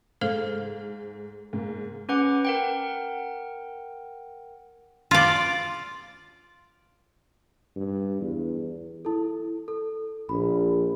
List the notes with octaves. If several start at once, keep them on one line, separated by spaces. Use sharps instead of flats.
G#2 A4 C5 F5
G#2 A#3
C#4 B4 F#5 D6
A#4 F#5 G5
F4 D5
G2
E2
E4 A4
A4
A#1 B5